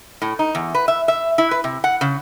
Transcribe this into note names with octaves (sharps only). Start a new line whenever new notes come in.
A2
D#4
E2
B4
E5
E5
E4
B4
C3
F#5
C#3